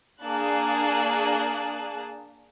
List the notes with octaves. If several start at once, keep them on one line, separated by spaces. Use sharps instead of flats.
A#3 D4 G#4 A5 F#6